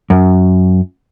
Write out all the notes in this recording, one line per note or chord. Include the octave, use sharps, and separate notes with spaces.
F#2